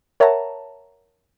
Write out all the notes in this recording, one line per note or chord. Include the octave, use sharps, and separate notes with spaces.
A#4 C#5 E5 F#5 A5 A#5